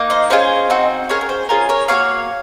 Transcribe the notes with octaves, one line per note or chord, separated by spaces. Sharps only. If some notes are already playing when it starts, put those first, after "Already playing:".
Already playing: A#3 D#4
C5 D#5
C#4 F4 G#4 C5 D#5
C4 D#4 F#4
C#4 G#4 A#4 C#5
A#4
C5
C#4 F4 G#4 A#4
A#4 C#5
A#3 D#4 F#4 C#5 F5